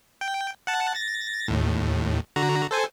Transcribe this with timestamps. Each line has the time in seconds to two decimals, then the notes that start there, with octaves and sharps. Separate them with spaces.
0.21 G5
0.67 F#5 A5
0.95 A6 A#6
1.48 D#2 A2
2.36 D3 F#4 A#5
2.71 A4 C5 G#5